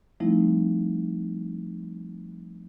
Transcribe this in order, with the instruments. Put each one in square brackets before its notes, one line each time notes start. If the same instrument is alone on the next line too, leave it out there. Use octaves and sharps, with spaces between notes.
[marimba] F3 G3 A3 C4 D#4 E4